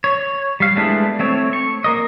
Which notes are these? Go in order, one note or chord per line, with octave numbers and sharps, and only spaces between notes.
C#5
G3 F5
G#3 A3 B3 D4 E4
A3 C4 C#5
C#6
A#3 A#4 D#5